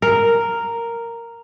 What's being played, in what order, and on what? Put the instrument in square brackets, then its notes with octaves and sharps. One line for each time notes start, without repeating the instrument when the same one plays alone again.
[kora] A#4